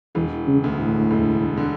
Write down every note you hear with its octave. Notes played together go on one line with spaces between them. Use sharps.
E1 E3
C#3
D2
A2
E1
D3